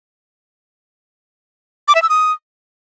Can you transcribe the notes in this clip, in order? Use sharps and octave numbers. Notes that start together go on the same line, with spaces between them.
D6
E5
E6
D#6